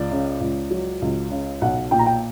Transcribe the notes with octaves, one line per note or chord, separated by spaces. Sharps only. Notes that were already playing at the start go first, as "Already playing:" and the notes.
Already playing: C#2 D5
C#3
C#2
F#3
C#2
C#3
B1 F#5
A#2 G5
A#5
G5